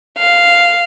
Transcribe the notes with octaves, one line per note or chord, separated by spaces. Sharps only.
F5